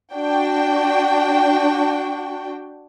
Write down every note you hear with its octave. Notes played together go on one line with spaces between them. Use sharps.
D4 F#4 G5